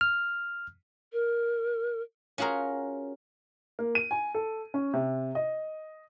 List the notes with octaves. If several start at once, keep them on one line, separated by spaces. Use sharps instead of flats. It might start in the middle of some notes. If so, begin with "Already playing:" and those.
F6
A#4
C#4 F4 F#4 G#4 A#4
A#3
D#7
G#5
A4
C#4
C3
D#5